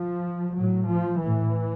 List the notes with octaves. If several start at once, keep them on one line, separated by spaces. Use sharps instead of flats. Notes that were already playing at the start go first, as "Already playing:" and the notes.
Already playing: F3
A2 F#3
F3
A2 E3